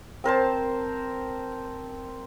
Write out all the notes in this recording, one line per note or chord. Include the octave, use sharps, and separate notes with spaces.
C4 A#4 C5 A5